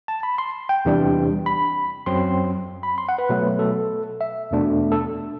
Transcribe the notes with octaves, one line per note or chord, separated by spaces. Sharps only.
A5
B5
C6
G5
E2 C3 E3 G3 D4
B5
F#2 F#3 C4 C6
B5
C6
F#5
B4
B2 F#3 A3
A4
E5
E2 B2 A3 D4
A4